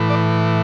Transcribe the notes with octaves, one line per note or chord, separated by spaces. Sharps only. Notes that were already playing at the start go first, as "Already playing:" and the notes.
Already playing: A2 E3
D5